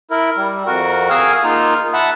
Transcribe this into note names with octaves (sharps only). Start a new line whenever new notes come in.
E4 A#4
G3
F2 F#4 A#4
G#4 A#4 F5 G#5 D#6 E6
A#3 D#4 F4 F6
E5 F#5 A5 B5